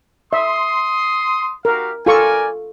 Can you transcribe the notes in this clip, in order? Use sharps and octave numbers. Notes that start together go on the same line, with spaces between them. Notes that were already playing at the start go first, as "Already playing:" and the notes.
E5 C6 D#6
F#4 G4 A#4 F5
F4 A4 A#4 D5 G#5 C#6